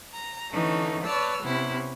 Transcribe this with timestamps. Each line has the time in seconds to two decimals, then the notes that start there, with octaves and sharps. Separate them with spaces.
0.13 A#5
0.52 D3 E3 A3 C#4 D#4
1.05 B4 C#5 D5 A5 E6 F6
1.41 C3 B3 C#4 E4